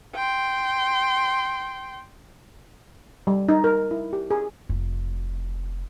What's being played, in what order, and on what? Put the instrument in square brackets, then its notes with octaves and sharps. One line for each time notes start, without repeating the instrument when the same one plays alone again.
[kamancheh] G5 C6
[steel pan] G3
D#4
A#4
E4
G4
G#4
[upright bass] F1